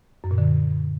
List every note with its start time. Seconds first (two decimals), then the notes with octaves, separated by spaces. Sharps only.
0.24 F#2
0.31 A#2
0.38 D3